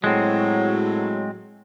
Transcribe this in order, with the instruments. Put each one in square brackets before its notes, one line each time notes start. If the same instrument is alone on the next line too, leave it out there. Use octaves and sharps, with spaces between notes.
[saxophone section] A2 F#3 [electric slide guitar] G#3 C4